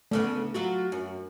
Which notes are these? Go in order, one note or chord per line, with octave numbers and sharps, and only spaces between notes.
D2 C#3 A3 B3
F#3 F4 F#4
F#2